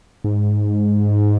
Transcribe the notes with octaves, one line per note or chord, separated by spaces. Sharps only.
G#2